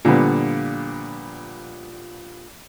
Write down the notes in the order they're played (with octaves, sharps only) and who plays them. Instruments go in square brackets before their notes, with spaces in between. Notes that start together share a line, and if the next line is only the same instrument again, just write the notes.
[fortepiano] A#2 D3 F3 G3 B3